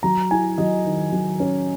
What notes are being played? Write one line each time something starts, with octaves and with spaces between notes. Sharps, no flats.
F#3 A#5
E4 G#5
F#3 D#5
D#3
F#3
C#4